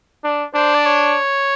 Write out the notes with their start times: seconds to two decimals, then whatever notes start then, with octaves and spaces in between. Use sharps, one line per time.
0.24 D4
0.54 D4 C5
0.75 D5
0.86 C#5